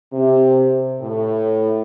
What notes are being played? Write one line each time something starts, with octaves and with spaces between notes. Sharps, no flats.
C3
A2